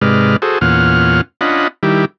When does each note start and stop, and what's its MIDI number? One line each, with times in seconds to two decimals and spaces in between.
0.02 0.36 44
0.02 0.36 48
0.02 0.36 56
0.02 0.36 71
0.02 0.36 74
0.02 0.36 89
0.42 0.59 66
0.42 0.59 68
0.42 0.59 69
0.42 0.59 72
0.61 1.21 40
0.61 1.21 46
0.61 1.21 61
0.61 1.21 65
0.61 1.21 78
0.61 1.21 89
1.41 1.68 61
1.41 1.68 62
1.41 1.68 65
1.41 1.68 75
1.41 1.68 78
1.41 1.68 83
1.83 2.05 51
1.83 2.05 55
1.83 2.05 64
1.83 2.05 67